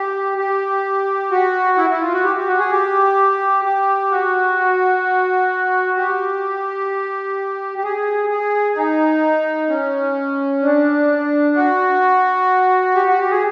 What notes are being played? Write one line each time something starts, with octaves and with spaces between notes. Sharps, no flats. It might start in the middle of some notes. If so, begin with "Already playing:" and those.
Already playing: G4
G4
F#4
E4
E4
F4
F#4
G4
G4
F#4
G#4
G4
G4
F#4
G4
G4
G#4
G#4
D#4
C#4
D4
F#4
G4
F#4
G4
G#4